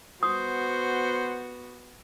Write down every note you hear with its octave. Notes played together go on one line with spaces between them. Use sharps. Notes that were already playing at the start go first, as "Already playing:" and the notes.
B3 F#4 C5 D#6